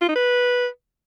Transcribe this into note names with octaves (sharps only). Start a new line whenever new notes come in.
F4
D#4
B4